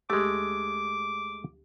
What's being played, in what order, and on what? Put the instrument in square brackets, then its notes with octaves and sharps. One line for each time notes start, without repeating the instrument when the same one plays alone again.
[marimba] D2 G4 [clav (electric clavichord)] G#3 A3 [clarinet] D6